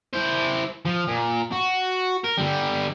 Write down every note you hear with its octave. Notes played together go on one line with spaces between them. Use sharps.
E4 C5
F3
A#2
F#4
A#4
D3 G3